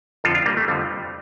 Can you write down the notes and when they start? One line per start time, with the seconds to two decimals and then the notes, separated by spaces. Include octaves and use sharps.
0.24 F2 D3 F3 F4 A4
0.35 D4 F4
0.46 G3 A#3
0.57 A3
0.68 F2 D3 F3 G3